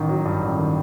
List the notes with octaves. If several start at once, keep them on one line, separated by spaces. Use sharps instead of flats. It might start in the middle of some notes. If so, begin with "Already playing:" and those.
Already playing: A1 D#3
F#3
G2
A1
D#3